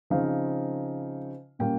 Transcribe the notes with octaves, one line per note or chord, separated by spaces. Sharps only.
C#3 F3 C4 D#4 F5
A#2 G3 A#3 C#4 G5